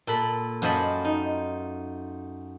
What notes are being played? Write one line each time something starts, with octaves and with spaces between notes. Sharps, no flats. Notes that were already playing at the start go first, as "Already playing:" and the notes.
A#2 A4 B5
F#2 F4 C5 D#5 A5 B5
D#4